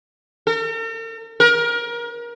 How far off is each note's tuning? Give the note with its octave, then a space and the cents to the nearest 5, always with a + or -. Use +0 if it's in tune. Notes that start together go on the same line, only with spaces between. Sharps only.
A#4 -45
A#4 +25